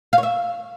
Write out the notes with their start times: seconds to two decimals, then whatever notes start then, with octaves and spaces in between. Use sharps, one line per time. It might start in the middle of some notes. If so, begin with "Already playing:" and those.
0.13 F5
0.18 C#5
0.23 E5